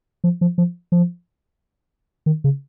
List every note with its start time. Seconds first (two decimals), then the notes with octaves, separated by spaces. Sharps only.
0.24 F3
0.41 F3
0.58 F3
0.92 F3
2.26 D#3
2.44 C#3